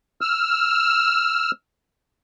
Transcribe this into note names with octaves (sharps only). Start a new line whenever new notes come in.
E6 F6